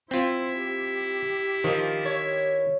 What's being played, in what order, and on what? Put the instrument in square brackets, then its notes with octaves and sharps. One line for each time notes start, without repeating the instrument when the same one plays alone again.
[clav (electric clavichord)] C4 F4 [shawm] E4 [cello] C5
[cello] G4
[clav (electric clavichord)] D#3 [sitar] F3
[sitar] C#5